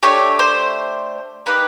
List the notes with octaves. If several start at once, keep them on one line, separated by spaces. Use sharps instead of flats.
A3 D4 G4 C#5
C5
A#3 D#4 G4 B4